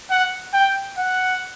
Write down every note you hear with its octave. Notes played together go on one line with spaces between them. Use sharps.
F#5
G5
F#5